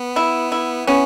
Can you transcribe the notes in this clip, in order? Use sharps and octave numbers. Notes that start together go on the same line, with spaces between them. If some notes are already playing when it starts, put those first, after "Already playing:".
Already playing: B3
E4
E4
B3 C#4